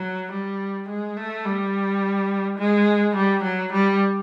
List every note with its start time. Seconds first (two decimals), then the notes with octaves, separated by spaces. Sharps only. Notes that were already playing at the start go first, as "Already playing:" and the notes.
Already playing: F#3
0.32 G3
0.89 G#3
1.17 A3
1.45 G3
2.59 G#3
3.15 G3
3.44 F#3
3.73 G3